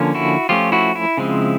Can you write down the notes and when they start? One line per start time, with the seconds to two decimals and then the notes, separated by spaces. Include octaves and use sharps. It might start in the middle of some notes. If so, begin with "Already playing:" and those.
Already playing: D3 F3 A#3 C#4
0.15 E4 F#4
0.49 F3 A3 C#4 F4 G4
0.72 E4 F#4
0.95 E4
1.17 C#3 F3 G#3 C4